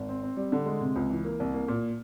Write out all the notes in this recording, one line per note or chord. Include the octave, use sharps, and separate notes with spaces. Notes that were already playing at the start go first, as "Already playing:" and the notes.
Already playing: G#1
C4
C4
G3
D3
G#3
C3
C#2
E3
A#3
C2
A#3
A#2